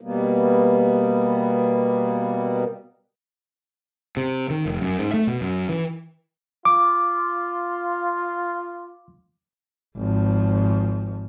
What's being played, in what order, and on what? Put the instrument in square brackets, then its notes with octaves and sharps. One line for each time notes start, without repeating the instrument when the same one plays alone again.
[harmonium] B2 G3 A#3 B3
[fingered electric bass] C3
D#3
F1
F#2
G#2
A3
B2
F#2
E3
[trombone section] F4 [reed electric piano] D6
[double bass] G#1 F3